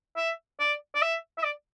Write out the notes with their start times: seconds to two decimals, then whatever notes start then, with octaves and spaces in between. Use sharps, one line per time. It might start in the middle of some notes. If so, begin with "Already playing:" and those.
0.17 E5
0.60 D5
0.95 D5
1.02 E5
1.38 E5
1.44 D5